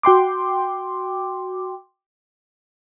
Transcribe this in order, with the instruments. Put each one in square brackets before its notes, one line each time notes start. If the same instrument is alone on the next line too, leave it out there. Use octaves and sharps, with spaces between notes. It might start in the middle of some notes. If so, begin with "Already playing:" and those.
[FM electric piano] F#4 G5 C6 D6